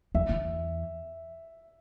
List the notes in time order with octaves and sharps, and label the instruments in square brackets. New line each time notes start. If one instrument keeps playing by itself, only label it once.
[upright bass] E2 [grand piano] E5
[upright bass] E2